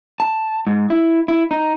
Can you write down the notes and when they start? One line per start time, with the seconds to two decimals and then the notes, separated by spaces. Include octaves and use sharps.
0.20 A5
0.67 G#2
0.90 E4
1.28 E4
1.51 D#4